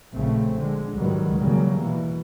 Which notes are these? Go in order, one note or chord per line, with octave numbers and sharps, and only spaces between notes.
A#1 C#3 A3 C4
D3 G#3
C#2 G#2 D#3 F#3 G3 B3
E2 C#3 F#3 G3 A#3
B2 E3